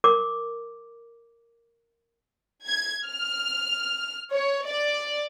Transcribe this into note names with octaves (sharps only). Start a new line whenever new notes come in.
A#4 D6
G#6
F6
C#5
D5